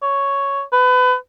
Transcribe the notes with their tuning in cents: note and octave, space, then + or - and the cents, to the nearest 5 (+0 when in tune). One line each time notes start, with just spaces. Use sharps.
C#5 +0
B4 +30